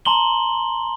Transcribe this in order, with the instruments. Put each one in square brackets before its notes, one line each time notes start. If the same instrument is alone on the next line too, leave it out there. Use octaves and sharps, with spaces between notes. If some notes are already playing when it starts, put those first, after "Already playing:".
[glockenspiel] A5 A#5 C6 F#7 G7